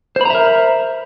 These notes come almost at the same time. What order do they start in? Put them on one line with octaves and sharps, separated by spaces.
C5 B5 A#5 E5 A#4